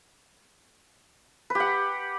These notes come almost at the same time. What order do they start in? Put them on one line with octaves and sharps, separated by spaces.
B4 G4 F#5